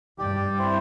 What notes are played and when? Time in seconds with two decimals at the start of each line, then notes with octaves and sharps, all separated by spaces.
0.18 G2 G4 D5 G5
0.58 C4 E4 C5